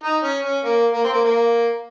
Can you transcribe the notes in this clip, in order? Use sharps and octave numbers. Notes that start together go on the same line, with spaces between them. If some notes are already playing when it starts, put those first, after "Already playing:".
D#4
C#4
C#4
A#3
A#3
C4
A#3
A#3